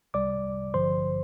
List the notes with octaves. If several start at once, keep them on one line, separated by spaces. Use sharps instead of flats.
C2 C3 G3 D5 D6
A1 G2 D3 F3 C5 C6